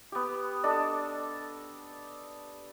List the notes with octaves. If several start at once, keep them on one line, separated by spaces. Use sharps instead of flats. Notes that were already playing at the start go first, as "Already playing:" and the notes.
B3 G4
D4 A4 D5 D#5